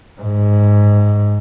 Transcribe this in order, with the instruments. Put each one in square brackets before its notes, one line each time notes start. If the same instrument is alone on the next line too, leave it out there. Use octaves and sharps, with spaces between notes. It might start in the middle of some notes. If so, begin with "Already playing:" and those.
[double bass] G#2